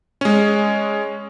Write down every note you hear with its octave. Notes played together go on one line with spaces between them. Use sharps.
G#3 C#4